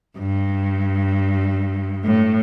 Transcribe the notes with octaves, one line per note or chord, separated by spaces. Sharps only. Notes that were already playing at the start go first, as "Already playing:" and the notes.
G2
A2